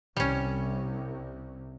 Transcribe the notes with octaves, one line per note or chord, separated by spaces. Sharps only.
C2 G3 C#4